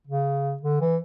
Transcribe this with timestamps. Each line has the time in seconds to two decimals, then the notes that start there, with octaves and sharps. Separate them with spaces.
0.07 C#3
0.63 D3
0.81 E3